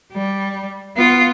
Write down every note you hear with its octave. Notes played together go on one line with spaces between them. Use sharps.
G3
B3 F4